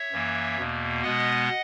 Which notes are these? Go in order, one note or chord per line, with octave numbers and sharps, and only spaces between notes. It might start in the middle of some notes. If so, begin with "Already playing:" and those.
Already playing: C#5 E5
F#2 E3 A#3
E2 B2 A#3
B2 G#3 B3 D#5 F#5